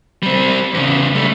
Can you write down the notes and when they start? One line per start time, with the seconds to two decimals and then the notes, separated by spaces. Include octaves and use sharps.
0.23 G3 C4
0.74 E2 C#3
1.15 G3 A3